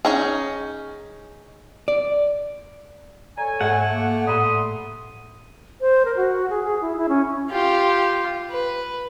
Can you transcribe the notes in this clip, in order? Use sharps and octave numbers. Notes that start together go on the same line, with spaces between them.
C#4 D#4 G#4
D5
A4 C#5 D5 G#5 A#5
G#2 A3 F#5
A#3
A2 D5 B5 C6 D#6
C5
A#4
F#4
G#4
G#4
E4
E4
C#4
F4 G4
B4